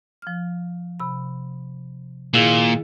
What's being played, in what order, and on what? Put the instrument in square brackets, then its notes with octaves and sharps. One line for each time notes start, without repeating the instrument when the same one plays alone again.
[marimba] F3 F6
C3 B5
[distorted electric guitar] A#2 [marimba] D#3 E4 G#4